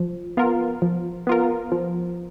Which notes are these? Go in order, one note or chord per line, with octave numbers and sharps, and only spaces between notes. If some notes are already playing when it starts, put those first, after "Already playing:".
Already playing: F3
B3 F4 A#4
F3
B3 F4 A#4
F3